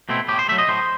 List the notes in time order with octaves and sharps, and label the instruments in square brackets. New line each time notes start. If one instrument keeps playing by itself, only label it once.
[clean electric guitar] B2 A3 C4 E4
A2 G4
C5
F#3 A3 E5
D#5
A2 C5